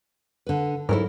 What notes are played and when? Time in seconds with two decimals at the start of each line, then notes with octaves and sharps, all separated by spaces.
0.46 D3 B4
0.89 G#2 F#3 E4 A4 A#4